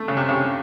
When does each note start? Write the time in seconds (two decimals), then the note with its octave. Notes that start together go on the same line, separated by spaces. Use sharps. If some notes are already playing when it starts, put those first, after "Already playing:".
Already playing: A3
0.08 C#3
0.17 C3
0.29 C#3